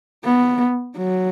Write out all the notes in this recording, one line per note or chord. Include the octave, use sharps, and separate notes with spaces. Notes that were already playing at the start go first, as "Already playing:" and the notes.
B3
F#3